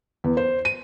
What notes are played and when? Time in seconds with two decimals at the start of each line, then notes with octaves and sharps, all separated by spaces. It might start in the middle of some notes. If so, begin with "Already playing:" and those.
0.24 E2
0.37 C5
0.65 D#7